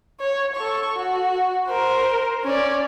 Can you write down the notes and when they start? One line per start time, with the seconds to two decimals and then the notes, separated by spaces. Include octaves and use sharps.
0.20 C#5
0.55 A4 C#6
0.95 F#4
1.68 A#4 C5
2.44 C#4 D5